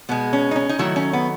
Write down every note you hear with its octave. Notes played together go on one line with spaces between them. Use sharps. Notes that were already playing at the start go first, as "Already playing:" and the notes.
B2 G#3 B3
C#4
D#4
C#4
D#4
D#3 F#3 A3 E4
C#4
B3